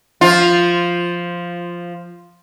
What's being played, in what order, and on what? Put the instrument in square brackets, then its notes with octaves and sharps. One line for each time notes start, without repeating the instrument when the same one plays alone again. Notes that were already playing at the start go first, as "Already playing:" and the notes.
[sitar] F3 F4